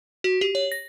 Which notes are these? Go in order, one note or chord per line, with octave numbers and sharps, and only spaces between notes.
F#4
G4
C#5
A#6